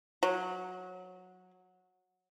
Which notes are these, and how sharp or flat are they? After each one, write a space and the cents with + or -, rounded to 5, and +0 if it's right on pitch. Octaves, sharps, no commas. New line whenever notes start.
F#3 -15